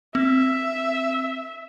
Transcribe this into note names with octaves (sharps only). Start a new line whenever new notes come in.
C4 E5